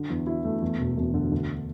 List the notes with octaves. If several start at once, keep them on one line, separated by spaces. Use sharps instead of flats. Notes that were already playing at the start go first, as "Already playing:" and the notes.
Already playing: D3
E2
E4
A3
E2
E1
E1
D3
D2